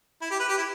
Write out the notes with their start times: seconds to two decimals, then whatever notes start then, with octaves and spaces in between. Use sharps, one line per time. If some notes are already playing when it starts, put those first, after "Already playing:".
0.22 E4
0.31 G4
0.40 B4
0.49 G4
0.58 E4